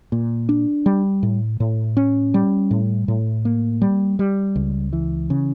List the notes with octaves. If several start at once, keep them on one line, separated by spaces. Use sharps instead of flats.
A#2
D4
G3
A2
A2
C#4
G3
A2
A2
A#3
G3
G3
C#2
E3
C#3